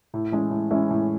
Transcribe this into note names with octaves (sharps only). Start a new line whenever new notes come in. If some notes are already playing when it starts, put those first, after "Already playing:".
A2
E3 G#3 C#4 E4
A2
E3 G#3 C#4 E4
A2